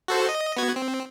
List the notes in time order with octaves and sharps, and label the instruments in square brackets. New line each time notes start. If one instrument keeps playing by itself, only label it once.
[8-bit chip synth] F#4 A4 C5
D#5
B3 F#4 G#6
C4